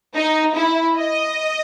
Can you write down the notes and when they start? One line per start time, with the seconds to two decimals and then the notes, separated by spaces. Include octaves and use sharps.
0.16 D#4
0.56 E4
0.97 D#5